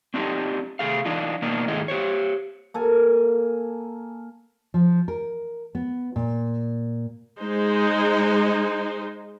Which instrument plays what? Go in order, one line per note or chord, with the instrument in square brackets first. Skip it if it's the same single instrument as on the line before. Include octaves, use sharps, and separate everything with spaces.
[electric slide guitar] C4 D4 D#4 F#4 G4
C3 A3 G#4 F5
E3 D4 D#4 F4
B2 A#3 D4 D#4
G#2 D#3 A3 E4 G#4 D#5
G4 C5 C#5
[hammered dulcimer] A#3 A4 G#5
[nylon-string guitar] F3
A#4
B3
A#2
[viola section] G#3 D#4 C5